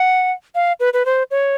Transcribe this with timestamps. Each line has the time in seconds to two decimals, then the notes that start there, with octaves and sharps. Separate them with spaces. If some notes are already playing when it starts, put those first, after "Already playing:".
Already playing: F#5
0.55 F5
0.80 B4
0.93 B4
1.06 C5
1.31 C#5